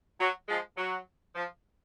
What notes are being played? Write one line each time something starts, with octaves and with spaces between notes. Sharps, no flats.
F#3
F3 G#3
F#3
F3